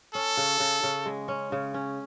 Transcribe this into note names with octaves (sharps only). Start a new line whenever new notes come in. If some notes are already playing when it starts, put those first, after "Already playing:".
C#4 A4
C#3
C#3
C#3
G#3
C#4
C#3
C#4